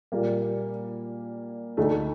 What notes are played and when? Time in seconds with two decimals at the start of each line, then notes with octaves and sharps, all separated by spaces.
0.12 A#2 G3 A#3
1.77 D2 D3 A3 D#4